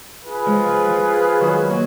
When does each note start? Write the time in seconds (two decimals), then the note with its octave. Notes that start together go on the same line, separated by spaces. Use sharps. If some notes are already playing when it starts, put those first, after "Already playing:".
0.24 F4 G#4 B4
0.46 F3 G#3
0.68 F3
0.90 F3
1.41 D#3 F#3
1.70 F#3 A#3